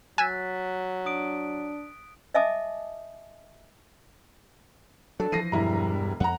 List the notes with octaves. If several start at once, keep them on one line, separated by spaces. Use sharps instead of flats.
F#3 G#5 E6 F#6 A6 B6
D4 D#6 D7
D#5 E5 G#5 A5 D6 D#6
F#3 D4 A4
E3 F3 A#6 C7 D#7
E1 G2 E4 A#5
F2 F#5 A#5